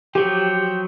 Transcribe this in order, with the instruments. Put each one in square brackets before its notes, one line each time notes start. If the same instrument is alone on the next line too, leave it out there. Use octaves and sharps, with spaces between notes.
[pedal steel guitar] F3 F#3 [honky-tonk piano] G4 [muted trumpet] G5